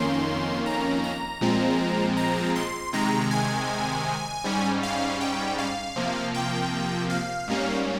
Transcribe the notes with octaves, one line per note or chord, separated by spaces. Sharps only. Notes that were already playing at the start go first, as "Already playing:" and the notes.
Already playing: F2 D#3 A#3 C#4 C6
A#5
A#5
A#2 F3 G#3 C4
A#5
C6
C3 D#3 G#3 A#5
G#5
G#2 G3 C#4
F5
G5
F5
C3 F3 A#3
G5
F5
G#2 G3 A#3 C#4